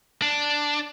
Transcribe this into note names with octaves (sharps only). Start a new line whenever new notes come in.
D4